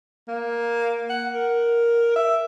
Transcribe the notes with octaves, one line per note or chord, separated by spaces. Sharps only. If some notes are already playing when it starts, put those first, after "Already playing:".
A#3
F#5
A#4
E5